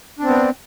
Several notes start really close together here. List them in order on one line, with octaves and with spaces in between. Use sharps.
D4 C4 B3